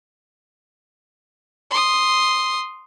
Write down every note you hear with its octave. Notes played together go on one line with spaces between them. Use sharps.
C6 D#6